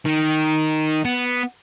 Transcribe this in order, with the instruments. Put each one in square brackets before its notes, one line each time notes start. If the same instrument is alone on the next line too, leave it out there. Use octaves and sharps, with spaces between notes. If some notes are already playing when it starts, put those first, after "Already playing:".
[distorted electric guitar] D#3
B3